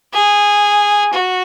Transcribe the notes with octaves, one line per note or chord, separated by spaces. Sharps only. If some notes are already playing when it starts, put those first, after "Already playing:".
G#4
F#4